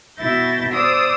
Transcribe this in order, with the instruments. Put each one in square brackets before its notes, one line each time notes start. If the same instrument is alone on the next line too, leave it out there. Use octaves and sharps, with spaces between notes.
[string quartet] B2 E4 E5 G6 A6 A#6
C5 D5 D#6 E6